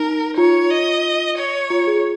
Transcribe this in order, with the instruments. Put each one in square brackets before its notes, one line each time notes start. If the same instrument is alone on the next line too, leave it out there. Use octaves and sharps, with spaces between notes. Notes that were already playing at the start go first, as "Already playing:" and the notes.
Already playing: [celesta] D#4 [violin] A#4
[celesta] F4 [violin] C#5
[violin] D#5
C#5
[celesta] F4
G#4